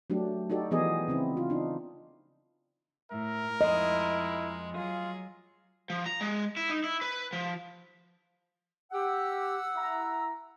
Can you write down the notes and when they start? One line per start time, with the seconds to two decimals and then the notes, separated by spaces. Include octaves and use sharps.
0.10 F#3 A3 D4 G4
0.50 D#4 F#4 G4 A4 D5
0.71 E3 F3 B3 G4 G#4 D#5
1.08 C#3 C4 E4
1.37 F4
1.50 D4 D#4
3.11 A2 A#4 E5
3.61 F2 G#3 E4 D#5
4.75 F#3 F4 G#4
5.90 F3
6.06 A#5
6.21 G#3
6.57 E4
6.70 D#4
6.84 E4
7.02 B4
7.33 F3
8.92 G4 F#5 E6
9.75 E4 A#5